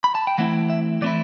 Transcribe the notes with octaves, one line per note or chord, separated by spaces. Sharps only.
B5
A5
G5
E3 A3 C4 E4 F#5
E5
E3 A3 C4 E4 D5